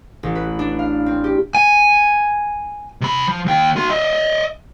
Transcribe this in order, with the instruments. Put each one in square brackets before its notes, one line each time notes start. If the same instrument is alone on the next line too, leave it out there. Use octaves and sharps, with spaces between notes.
[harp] A1
B4
D4
F5
C4
G4
[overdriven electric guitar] G#5
[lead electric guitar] C3 B5
F3
D#2 G5
F#4 C6
D#5 E5